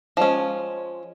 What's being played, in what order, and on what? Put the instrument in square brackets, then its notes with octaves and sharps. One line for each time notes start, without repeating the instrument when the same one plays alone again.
[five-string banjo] F3 G#3 C#4